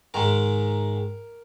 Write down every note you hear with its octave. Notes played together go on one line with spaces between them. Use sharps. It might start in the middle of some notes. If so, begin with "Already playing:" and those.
G#2 D#3 G#3 A#4